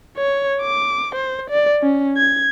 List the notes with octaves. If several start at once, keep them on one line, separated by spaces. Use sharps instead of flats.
C#5
D6
C5
D5
C#4
G#6